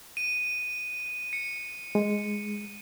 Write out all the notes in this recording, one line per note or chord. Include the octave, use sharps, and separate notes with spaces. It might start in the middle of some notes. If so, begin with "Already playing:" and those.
D#7
C#7
G#3